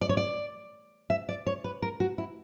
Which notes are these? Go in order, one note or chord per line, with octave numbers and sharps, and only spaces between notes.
D5
C#5
D5
E5
D5
C#5
B4
A#4
F#4
E4